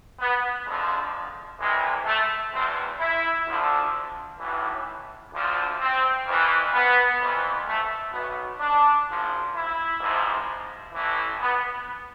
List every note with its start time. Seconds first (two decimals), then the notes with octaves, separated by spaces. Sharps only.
0.19 B3
0.66 F2 D3 F3 G#3
1.59 C2 C3 E3 G#3
2.06 A3
2.52 E2 B2 C4
2.99 E4
3.46 D2 D3 F3
4.39 B1 A2 E3
5.32 D2 D3 F3
5.80 C4
6.26 F2 E3
6.73 B3
7.19 F2 E3
7.66 A3
8.12 B1 B2 B3
8.59 D4
9.06 G#1 G#2 F3
9.53 E4
9.99 A1 G#2 F3
10.92 A1 A2 E3
11.39 B3